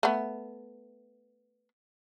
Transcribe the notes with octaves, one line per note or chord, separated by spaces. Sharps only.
A3 B3